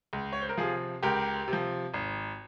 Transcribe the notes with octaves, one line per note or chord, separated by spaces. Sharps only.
C#2
C#5
C5
A#4
C3 F3 F4 G#4
C#2 G4 A#4
C3
F3
G#1